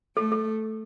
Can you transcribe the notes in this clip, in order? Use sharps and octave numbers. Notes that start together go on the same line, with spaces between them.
A3 A4
A4